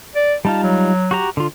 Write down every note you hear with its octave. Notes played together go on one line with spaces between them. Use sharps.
D5
G3 D#4 F4 A5
F#3
F#4 G4 A#5
D3 F4